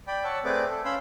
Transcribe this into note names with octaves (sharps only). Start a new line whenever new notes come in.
D5 G5 B5
C#5 F#5 A5 E6
A3 C4 G#4 B4 D5 D6
A4
C#4 F5 B5 C6 E6